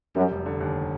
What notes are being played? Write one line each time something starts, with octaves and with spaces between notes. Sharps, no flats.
F#2 G3
F1
D3
D#2